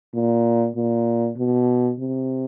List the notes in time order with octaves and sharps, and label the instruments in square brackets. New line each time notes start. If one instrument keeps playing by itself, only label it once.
[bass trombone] A#2
A#2
B2
C3